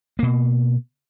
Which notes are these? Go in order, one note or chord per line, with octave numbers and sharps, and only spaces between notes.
B2 A#3